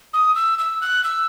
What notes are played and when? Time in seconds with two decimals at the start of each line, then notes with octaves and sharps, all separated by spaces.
0.13 D#6
0.35 E6
0.59 E6
0.81 F#6
1.04 E6